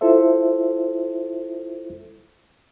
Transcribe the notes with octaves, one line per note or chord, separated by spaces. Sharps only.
E4 F4 A4 C5 E5